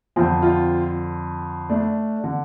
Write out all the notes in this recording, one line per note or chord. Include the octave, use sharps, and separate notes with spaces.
F2 D3 C4 F4
C4 F4
A3 D4
D3